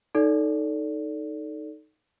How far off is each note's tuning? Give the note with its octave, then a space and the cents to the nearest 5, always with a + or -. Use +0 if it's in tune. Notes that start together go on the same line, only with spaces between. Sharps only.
D#4 +0 A4 +0 D5 -30